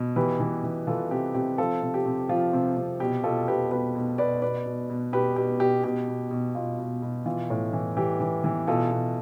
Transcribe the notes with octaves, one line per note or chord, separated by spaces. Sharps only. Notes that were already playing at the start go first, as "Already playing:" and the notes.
Already playing: B2
E3 G4 B4
E3
E3
E3 F4 A4
C3 G4
C3 G4
F3 F4 A4
C3
G4
C3
F3 F4
C3
C3
B2 G4
B2 F4 A4
B2 G4 B4
B2 G4 B4
B2
B2 B4 D5
B2 B4 D5
B2
B2
B2 G4 B4
B2 G4
B2 G4
B2 G4
B2
B2
B2 F4
B2
B2
E3 F4
A2
E3
E3 G4
E3
E3
B2 F4 A4
B2